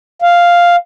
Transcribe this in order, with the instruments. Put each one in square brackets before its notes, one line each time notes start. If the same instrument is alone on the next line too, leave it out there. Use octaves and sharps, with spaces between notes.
[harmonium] F5